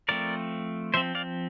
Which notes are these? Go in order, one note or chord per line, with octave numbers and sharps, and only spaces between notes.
F3 A3 C4 A#4 D5
F3 C4 C5 E5
D5 F5